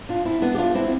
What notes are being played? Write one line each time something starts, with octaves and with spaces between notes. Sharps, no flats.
D4 F4
C4 E4
B3 D4
G4
D4 F4
C4 E4